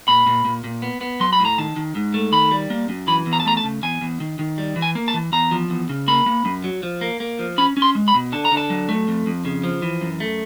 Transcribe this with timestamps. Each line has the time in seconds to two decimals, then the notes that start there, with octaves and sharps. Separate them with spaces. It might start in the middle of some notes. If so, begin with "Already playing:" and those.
0.08 A#2 B5
0.26 A#2
0.45 A#2
0.64 A#2
0.82 B3
1.01 B3
1.20 F#3 C6
1.33 B5
1.40 A2
1.45 A#5
1.58 D#3 A5
1.76 D#3
1.95 G#2
2.14 A3
2.32 D#3 B5
2.51 G3
2.70 A#3
2.89 F#2
3.07 E3 B5
3.26 E2
3.33 A#5
3.40 A5
3.45 A3 A#5
3.57 A5
3.64 C#3
3.83 E2 G#5
4.01 E2
4.20 D#3
4.39 D#3
4.58 G3
4.76 E3
4.82 G#5
4.95 A#3
5.08 A5
5.14 E3
5.32 E2 A#5
5.51 F3
5.70 E2
5.89 C#3
6.08 A#3 B5
6.26 A#3
6.45 F#2
6.64 F#3
6.83 F3
7.01 A#3
7.20 A#3
7.39 F3
7.58 C#4 B5
7.77 C#4
7.82 C6
7.95 G#3
8.08 B5
8.14 B2
8.32 D3 A5
8.45 A#5
8.52 D3
8.57 A5
8.70 F#3
8.89 A3
9.08 F2
9.26 F2
9.45 C#3
9.64 F3
9.82 E3
10.01 F#2
10.20 A3